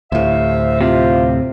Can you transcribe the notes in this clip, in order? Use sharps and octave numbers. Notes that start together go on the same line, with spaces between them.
D2 A2 C3 E5 F5
C3 F4 G4